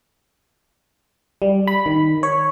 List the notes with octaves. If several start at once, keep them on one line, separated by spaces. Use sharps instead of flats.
G3
B5
D#3
C#5